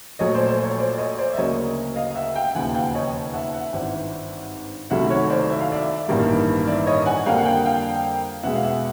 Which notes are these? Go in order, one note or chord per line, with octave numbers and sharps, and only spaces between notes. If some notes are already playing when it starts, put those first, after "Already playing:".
A#1 A#2 F#3 A3 C#5 D#5
C5 D5
C5
C#5
C5 D5
C#5 D#5
C5 D5
E5
D2 C#3 F#3 A#3 C#5 D#5
D#5 F5
E5 F#5
F5 G5
E1 D#2 C#3 F3 F#5 G#5
F5 G5
C#5 D#5
E5 F#5
E5 F#5
G#1 G2 E3
C2 C3 D#3 F#3 A3 E5 F#5
C#5
C5 D5
E5
F5
D5 E5
A1 G2 D#3 G3 A#3
D5 E5
C#5 D#5
F#5 G#5
F2 D3 G3 A#3 F5 G5
F#5
F5 G5
F5 G5
E2 B2 G#3 E5 F#5
F5
E5 F#5